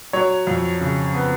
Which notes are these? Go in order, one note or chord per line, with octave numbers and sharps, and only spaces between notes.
F#3 C#5
F2
C#3
B3